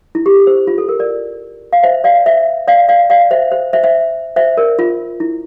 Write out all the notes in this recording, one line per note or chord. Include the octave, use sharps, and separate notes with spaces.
E4
G4
A4
C5
F4
A4
A#4
A#4 D5
F5
C5 E5
D5 F5
C5 E5
D5 F5
D5 F5
D5 F5
C5 E5
C5
C5 E5
C5 E5
C5 E5
A#4 D5
F4
E4